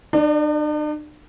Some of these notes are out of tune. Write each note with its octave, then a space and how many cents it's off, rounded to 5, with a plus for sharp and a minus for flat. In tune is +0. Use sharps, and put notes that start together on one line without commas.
D4 +45 D5 +0